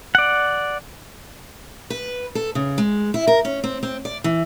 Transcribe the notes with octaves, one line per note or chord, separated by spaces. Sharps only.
D5 F#5
B4
A4
C#3
G#3
E4
A#4
C#4
C4
C4
D5
E3